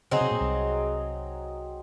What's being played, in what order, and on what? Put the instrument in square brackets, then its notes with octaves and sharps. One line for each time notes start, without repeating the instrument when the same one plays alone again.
[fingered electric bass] C#3 [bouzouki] F#3 C4 D#4 G#4
[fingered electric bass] C3
A#2
C2 C3